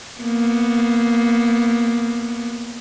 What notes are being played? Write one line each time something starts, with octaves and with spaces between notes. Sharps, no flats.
A#3 B3